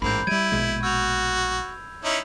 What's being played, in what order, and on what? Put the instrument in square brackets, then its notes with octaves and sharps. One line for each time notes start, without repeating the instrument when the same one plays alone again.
[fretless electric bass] A1 G#2 [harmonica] A#3 C4 [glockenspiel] B5 G6
[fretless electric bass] F#3 G3 [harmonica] E4 [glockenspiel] G#6 D7 D#7
[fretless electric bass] A#1 B2 G#3
[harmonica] F#4 [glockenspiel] E6 G6 F7
[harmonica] C#4 D#4 E4